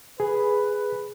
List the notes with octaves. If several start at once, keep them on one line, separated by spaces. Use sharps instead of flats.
G#4 B4